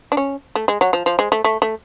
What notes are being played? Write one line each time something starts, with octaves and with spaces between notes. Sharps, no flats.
D4
C#4
A3
G#3
F#3
F3
F3
G#3
A3
A3
A3